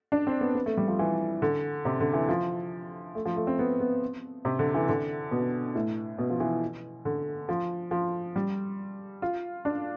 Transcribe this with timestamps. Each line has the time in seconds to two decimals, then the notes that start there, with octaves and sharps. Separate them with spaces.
0.12 D4
0.27 C4
0.41 B3
0.55 B3
0.66 A3
0.77 G3
0.88 F3
0.99 E3
1.42 D3
1.85 C3
2.00 D3
2.14 E3
2.29 F3
3.15 A3
3.26 F3
3.37 A3
3.47 C4
3.59 B3
3.80 B3
4.45 C3
4.59 D3
4.74 E3
4.89 D3
5.31 B2
5.75 A2
6.19 B2
6.30 F3
6.40 E3
7.05 D3
7.49 F3
7.91 F3
8.36 G3
9.22 F4
9.65 D4